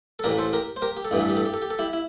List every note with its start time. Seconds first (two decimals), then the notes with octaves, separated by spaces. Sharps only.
0.19 A4
0.24 A1 A2 E3 G4 A#4
0.38 A4 C5
0.53 G4 A#4
0.76 C5
0.82 G4 A#4
0.97 G4
1.05 A4
1.11 A1 G2 E3 G4
1.21 A4
1.29 G4
1.37 A4
1.46 G4
1.54 A4
1.62 G4
1.70 A4
1.78 E4 G4
1.93 E4